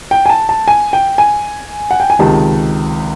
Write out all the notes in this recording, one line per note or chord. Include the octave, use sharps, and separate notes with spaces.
G5
G#5
A5
A5
G#5
G5
G#5
F#5
G5
G#5
C#2 C3 D#3 A5